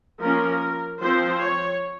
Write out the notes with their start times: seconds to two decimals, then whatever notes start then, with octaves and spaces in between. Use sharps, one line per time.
0.21 F3 A#3 C#4 A#4
1.01 F3 C4 C5
1.42 C#5